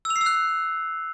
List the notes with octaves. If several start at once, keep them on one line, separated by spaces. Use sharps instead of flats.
E6
F7
C7
E6
F#6